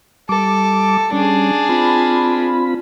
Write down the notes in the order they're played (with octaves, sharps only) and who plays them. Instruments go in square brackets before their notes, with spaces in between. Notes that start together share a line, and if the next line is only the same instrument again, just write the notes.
[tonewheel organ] G3 D6 [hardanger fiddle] A4
[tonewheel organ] G3 C#4 [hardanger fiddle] D4 G#4
[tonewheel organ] C4 F4 B5